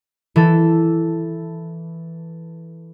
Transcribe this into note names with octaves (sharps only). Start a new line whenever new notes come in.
E3 A4